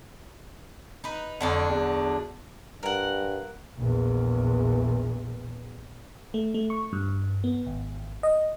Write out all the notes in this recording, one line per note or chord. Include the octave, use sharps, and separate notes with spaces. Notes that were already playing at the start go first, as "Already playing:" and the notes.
D#4 B4
F2 D3 F#3 D4
E2
G2 A#4 F#5
A#1 E2
A3
A3
C#6
G2
B3
G#1
D#5